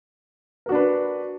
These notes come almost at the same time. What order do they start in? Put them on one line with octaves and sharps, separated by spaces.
A#4 F#4 D4 B4